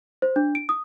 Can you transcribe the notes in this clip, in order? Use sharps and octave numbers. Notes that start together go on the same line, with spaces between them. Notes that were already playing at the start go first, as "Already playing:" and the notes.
C5
D4
D7
D#6